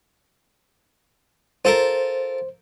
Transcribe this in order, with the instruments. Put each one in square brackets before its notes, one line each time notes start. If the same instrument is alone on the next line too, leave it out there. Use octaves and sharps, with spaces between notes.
[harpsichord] F4 A4 A#4 [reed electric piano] C5